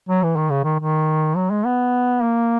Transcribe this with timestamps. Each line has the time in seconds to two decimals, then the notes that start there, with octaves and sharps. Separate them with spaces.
0.09 F#3
0.23 E3
0.36 D#3
0.50 C#3
0.64 D#3
0.79 D#3
1.36 F#3
1.51 G#3
1.65 B3
2.23 A#3